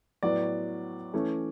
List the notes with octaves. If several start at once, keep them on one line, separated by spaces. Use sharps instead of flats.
A2 F#3 B3 D5
E3 A3 C#4